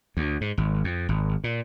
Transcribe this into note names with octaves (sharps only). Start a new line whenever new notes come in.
D2
G#2
G#1
F2
G#1
A#2